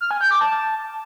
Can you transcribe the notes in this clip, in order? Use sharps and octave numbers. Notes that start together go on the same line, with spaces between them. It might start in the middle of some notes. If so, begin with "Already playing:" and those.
F6
G#5
G6
D6
A5